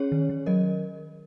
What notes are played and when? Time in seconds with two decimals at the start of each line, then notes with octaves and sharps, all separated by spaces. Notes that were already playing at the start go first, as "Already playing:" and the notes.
Already playing: C#4 G#4 C#5
0.12 D#3
0.29 D#3
0.46 F#3 A#4 D#5